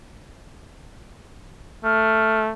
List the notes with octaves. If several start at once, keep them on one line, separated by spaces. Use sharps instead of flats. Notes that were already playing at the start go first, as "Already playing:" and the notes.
A3 F6